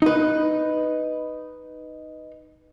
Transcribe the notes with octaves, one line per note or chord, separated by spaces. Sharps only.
D#4 B4